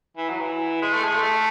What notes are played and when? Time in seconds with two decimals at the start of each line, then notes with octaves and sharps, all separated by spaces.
0.17 E3
0.29 F#3
0.40 E3
0.82 G#3
0.93 A3
1.04 G#3
1.15 A3